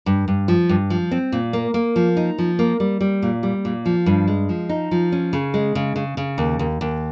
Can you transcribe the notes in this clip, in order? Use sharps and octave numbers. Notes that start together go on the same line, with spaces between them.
G2
G2
F3
G2
F3
C4
A#2
A#3
A#3
F3
D#4
F3
A#3
G3
G3
A#2
G3
A#2
F3
G2
G#3
F3
D#4
F3
C#4
C#3
G#3
C#3
C#3
C#3
D#2
D#2
D#2